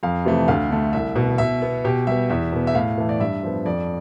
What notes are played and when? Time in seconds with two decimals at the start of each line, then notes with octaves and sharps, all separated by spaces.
0.03 F2 F5
0.25 C3 E3 A3
0.48 D2 F5
0.70 D3 A3
0.93 C2 E5
1.16 B2 B3
1.38 B2 E5
1.62 B3
1.85 B2 G4
2.07 G3 B3 E5
2.29 E2 E5
2.53 B2 B3
2.67 E5
2.74 A2 F5
2.98 E3 A3
3.09 D5
3.20 G2 E5
3.43 F3 B3
3.65 F2 D5